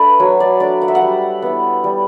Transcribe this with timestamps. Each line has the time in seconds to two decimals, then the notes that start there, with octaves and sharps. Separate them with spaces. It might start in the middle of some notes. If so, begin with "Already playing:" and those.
Already playing: A3 D4 A4 B4 D5
0.20 F#3 C#5
0.40 D5
0.60 A3 D4 D5
0.82 F#5
0.88 E5
0.95 F#5
1.02 G3
1.42 B3 E4
1.84 G3